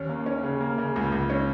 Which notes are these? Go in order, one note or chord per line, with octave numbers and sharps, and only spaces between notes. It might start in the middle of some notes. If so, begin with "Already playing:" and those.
Already playing: D#2 C#4
A#3
C#4
C#3
A#3
C#3
C#2
C#2
C#4